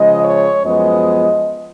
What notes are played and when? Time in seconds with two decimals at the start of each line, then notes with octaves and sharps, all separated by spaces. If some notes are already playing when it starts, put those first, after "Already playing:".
Already playing: C#3 F3 G#3 D#5
0.23 C#5
0.64 F#2 F3 G#3 B3 D#5